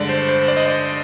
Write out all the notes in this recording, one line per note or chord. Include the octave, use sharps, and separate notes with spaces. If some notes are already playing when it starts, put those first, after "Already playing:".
Already playing: G2 D3 G#3 D5
C5
C5
D5
D#5
D5